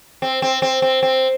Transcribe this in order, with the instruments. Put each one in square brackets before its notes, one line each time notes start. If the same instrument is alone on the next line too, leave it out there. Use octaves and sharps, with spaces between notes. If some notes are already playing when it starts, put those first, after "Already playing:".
[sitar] C4
C4
C4
C4
C4